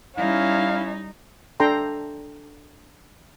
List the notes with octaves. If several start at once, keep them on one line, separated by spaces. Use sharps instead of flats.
G3 C#4 D#4 E4 F5
D4 A4 G5 A#5 C6